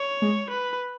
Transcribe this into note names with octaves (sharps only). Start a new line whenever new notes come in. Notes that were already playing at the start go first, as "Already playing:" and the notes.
Already playing: C#5
G#3
B4